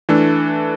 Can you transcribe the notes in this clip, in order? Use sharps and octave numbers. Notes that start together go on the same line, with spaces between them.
E3 A3 D4 A4